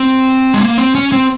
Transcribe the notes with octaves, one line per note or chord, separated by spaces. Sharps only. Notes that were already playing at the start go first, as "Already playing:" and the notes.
Already playing: C4
G#3
A#3
C4
C#4
C4